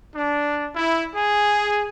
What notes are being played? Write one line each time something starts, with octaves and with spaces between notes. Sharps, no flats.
D4
E4
G#4